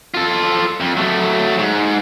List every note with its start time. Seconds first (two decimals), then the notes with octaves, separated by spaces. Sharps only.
0.14 F4 A4
0.80 F2
0.97 F#3 A3
1.58 G#2